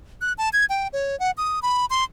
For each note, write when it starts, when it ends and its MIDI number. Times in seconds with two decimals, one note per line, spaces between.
0.21 0.33 90
0.38 0.49 81
0.53 0.65 92
0.70 0.88 79
0.93 1.18 73
1.20 1.31 78
1.38 1.60 87
1.63 1.86 83
1.90 2.04 84